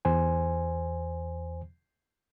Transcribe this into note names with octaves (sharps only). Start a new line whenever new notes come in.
E2 C5 G#5